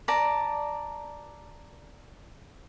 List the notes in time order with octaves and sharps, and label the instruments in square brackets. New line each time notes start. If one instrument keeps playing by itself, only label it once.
[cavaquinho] D5 A5 A#5